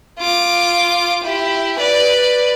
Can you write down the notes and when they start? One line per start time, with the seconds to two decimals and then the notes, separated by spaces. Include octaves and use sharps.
0.18 F4 D6
1.23 E4 G4
1.78 B4 D5